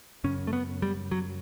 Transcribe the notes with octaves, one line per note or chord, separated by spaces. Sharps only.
F#2 C#3 C#4
A3
B3
G3
F#3